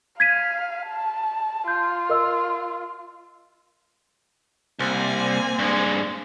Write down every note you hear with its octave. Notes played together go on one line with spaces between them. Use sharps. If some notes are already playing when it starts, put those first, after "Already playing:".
F5 G#6 B6 D#7
A5
F4 G6
A#4 D#5 E6
C2 A#3 C4 G#5
G2 G#3